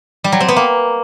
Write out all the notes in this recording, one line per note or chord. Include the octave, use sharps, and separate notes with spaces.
G3
F#3
C4
B3
A#3